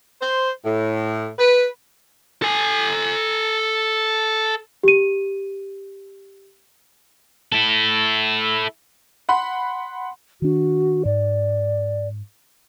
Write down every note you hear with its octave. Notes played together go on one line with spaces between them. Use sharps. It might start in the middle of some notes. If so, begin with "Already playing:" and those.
C5
A2
B4
A4 G#5
G4 D#7
E4 A4
F#5 B5 C6
D#3 D4 F#4
G#2 D5